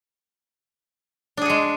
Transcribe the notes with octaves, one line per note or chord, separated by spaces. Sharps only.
G#3 D4 F#4 G#4